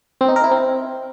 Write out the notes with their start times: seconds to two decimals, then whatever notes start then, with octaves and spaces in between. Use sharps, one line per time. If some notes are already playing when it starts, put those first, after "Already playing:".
0.21 C4
0.28 D#4
0.36 A#4
0.44 E4
0.51 C4